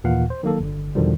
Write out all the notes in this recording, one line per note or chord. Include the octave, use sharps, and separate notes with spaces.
D#2 A#2 E3 F5 F#5
C5
D#3 F#3 A#3 A4
G1 D3
E2 B2 D3 D#3 F3 G3